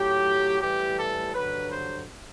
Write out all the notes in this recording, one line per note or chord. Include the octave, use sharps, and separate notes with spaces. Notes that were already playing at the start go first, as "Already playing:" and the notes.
Already playing: A2 F#3 G4
A2 E3 G3 G4
A4
G2 D3 F#3 B4
C5